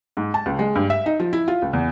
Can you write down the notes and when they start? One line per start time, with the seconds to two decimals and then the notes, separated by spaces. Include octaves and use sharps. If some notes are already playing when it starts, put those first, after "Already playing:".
0.17 G#2
0.34 A5
0.46 C#2
0.59 G#3
0.76 G2
0.90 E5
1.06 D#4
1.20 F3
1.33 E4
1.48 F4
1.62 C#2
1.73 E2